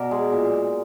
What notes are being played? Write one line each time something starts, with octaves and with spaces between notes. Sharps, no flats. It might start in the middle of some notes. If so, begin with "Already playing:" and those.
Already playing: B2 A#4 D5
G#3
A#2